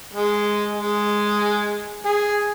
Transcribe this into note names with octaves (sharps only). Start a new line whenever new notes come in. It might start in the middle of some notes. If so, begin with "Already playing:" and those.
G#3
G#3
G#4